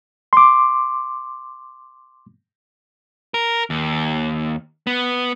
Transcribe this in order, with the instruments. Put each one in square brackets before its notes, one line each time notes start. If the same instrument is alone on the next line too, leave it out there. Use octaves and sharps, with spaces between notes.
[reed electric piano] C6 D6
[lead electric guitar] A#4
D#2
B3